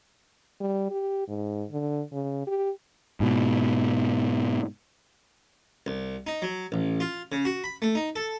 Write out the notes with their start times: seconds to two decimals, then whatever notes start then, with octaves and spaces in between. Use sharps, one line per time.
0.61 G3
0.90 G4
1.28 G#2
1.71 D3
2.12 C#3
2.47 G4
3.20 G#2 B2
5.87 C2
6.27 D#4
6.42 F#3
6.72 A1
7.00 F4
7.32 C#3
7.45 F#4
7.64 B5
7.82 A3
7.95 D#4
8.16 A4